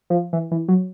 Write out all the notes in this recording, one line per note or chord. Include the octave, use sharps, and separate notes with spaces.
F3
E3
E3
F#3